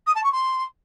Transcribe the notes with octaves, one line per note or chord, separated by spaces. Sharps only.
D#6
A5
C#6
C6